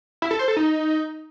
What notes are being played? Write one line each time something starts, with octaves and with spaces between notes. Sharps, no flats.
E4
A4
C5
A4
D#4